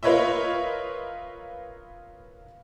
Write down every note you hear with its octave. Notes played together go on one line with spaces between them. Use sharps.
F4 A#4 B4 C#5 D#5 E5